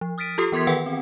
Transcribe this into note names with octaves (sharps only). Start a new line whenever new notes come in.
F3
D#6 F6 A6 B6 D7 D#7
F4 G4 A4 D#6 C7
E3 B3 A#4 C6 G#6 B6
D#3 B4 F#5 G5
C4